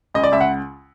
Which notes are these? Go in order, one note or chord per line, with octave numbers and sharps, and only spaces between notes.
C#2 D#5
D5
C#2 E5
F#5